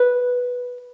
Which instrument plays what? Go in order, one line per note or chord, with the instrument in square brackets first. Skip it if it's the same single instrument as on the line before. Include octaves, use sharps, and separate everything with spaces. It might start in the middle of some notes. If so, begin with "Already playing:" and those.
Already playing: [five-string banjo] B4